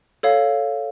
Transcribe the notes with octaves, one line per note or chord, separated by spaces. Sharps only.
A4 C#5 F5